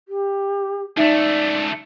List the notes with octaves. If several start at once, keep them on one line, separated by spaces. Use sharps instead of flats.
G4
C#2 A3 D#4 D5 E5